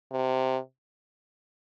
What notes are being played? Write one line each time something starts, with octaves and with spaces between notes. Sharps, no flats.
C3